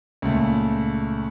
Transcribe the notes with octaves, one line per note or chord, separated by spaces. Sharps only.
C#2 A#2 A3